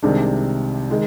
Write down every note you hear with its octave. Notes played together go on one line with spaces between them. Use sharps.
C2 C3 D#3 G#3 D4
D#3 G#3